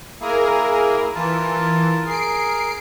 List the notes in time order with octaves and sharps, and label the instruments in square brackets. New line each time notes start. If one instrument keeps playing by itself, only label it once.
[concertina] A#3 E4 [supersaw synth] G#4 A#4
[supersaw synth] E3 [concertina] F4 A#4 A5
[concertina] G#4 A#4 [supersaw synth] C7 D7